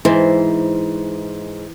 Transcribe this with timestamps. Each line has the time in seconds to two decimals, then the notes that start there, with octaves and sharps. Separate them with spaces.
0.05 G#2 E3 C5